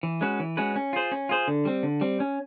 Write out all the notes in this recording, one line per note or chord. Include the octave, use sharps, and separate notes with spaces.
E3
G#3 C#4 F#4 B4
E3
G#3 C#4 F#4 B4
C#4
F4 G#4 C5
C#4
F4 G#4 C5
D3
G3 C4
D3
G3 C4
C#4